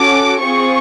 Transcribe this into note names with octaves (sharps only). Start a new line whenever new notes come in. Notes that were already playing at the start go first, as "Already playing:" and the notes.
Already playing: C#4 F#4 A4 D6
C4 F4 G#4 C#6